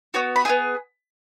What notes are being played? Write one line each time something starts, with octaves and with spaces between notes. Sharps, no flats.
B3 F#4 C#5
B5
B3 E4 G#4 G#5